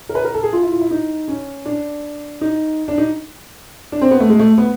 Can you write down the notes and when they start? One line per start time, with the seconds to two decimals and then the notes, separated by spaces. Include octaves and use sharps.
0.09 A#4
0.15 B4
0.24 A#4
0.34 A4
0.43 G#4
0.53 F4
0.62 E4
0.72 F4
0.81 E4
0.91 D#4
1.28 C#4
1.66 D4
2.41 D#4
2.88 D4
2.98 D#4
3.92 D4
4.01 C4
4.11 B3
4.20 A3
4.30 G#3
4.39 A3
4.58 B3